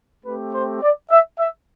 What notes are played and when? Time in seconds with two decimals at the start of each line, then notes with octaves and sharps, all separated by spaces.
0.25 A3 C4 G4 B4
0.53 C5
0.82 D5
1.11 E5
1.39 E5